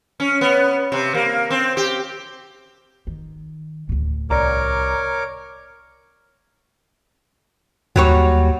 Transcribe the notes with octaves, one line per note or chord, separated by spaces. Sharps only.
C#4
B3
C3
A#3
C4
G4
D#3
D2 A2
C2 A#4 C#5 D5 A#5 D6
D#2 F#3 G3 C#5